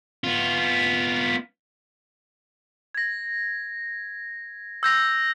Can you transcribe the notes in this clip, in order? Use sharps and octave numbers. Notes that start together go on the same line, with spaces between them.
B3 F4
G#6 A#6
E6 G6 A#6 F7